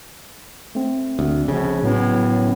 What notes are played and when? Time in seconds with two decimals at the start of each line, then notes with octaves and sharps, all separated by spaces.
0.75 A3 C4
1.19 D2
1.48 A#1 C#3
1.83 A2 F#3 B3 C#4